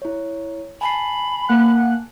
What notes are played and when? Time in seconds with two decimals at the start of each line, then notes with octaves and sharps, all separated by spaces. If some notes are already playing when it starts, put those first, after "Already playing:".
0.02 E4 C#5
0.81 G#5 A5 B5 C7
1.49 A#3 F#5 F#6